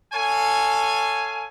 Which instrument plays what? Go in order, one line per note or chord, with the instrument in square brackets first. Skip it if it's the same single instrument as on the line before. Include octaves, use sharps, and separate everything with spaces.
[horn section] A4 C#5 F5 G#5